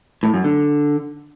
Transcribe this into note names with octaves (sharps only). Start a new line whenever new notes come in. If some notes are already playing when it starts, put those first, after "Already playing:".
A2
F#2
D3